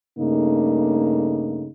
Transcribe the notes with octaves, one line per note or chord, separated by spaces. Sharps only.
G2 C#3 A3 A#3 D#4